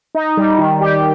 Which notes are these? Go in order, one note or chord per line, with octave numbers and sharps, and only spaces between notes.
D#4
G3
D#3
G4